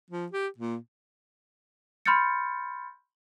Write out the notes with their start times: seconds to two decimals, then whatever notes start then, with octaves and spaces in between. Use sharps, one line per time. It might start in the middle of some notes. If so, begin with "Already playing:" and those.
0.11 F3
0.32 G4
0.58 A#2
2.06 B5 C6 F6 G6 A6 C#7